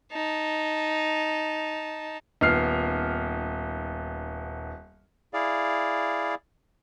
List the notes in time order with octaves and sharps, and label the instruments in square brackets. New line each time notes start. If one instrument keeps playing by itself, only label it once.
[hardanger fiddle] D#4 A5
[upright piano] D#1 B3 F6 C7
[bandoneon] E4 G#4 D5 F5